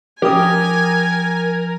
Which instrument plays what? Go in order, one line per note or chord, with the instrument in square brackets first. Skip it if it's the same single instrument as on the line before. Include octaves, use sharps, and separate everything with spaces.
[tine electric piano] F3 [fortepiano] G4 D#6 [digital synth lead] A#4 [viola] G#5